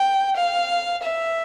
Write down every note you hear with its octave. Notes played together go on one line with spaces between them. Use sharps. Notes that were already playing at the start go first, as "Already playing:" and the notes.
Already playing: G5
F5
E5